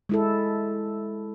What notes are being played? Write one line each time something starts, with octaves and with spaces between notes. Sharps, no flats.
G#3 E4 A4